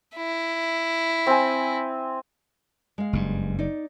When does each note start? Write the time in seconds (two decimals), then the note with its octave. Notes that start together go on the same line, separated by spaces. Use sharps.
0.16 E4
1.27 C4 G#5
2.98 G#3 F5
3.13 F#1 G2
3.59 D#4 D5